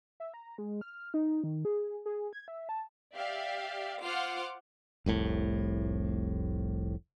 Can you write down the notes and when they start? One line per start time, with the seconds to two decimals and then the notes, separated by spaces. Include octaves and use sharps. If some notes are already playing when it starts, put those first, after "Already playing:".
0.20 E5
0.34 A#5
0.58 G#3
0.81 F6
1.14 D#4
1.44 D#3
1.65 G#4
2.06 G#4
2.33 G#6
2.48 E5
2.69 A5
3.15 G4 D5 E5 F5
4.02 F4 C5 F#5 C6 D6 F6
5.06 F1 C2 A2